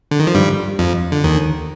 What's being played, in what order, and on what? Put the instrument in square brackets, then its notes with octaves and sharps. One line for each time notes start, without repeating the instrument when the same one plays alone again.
[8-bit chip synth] D3
D#3
F3
G2 G3
F2 F3
D3
D#2 D#3